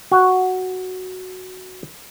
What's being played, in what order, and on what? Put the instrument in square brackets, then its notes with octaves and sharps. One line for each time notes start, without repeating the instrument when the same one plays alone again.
[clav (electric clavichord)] F#4 F#5